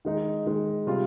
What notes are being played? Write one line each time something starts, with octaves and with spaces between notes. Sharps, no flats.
D#3 G#3 D#4
D#3 G#3 D#4
C3 G3 C4 F4